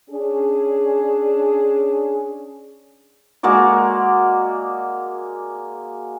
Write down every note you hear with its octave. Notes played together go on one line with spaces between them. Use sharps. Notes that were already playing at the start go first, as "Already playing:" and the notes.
C#4 D4 G#4
G#3 A#3 F#4 D5